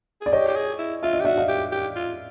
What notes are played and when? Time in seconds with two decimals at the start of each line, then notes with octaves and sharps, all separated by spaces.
0.21 G#4 D5
0.33 G4 C#5 D#5
0.48 G4
0.56 G#4
0.79 E4
1.03 F4 E5
1.14 D#5
1.21 G4
1.25 F#4 D5 E5
1.37 D#5 F5
1.48 G4
1.72 G4
1.96 F4